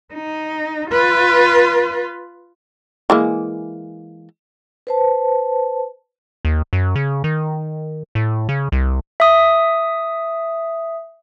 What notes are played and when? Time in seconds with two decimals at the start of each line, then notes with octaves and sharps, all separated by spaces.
0.14 D#4
0.90 F4 B4
3.10 E3 G#3 A#3
4.87 B4 C5 A5
6.45 D#2
6.73 F#2
6.95 C#3
7.24 D#3
8.15 A2
8.49 C#3
8.72 C2
9.20 E5 D#6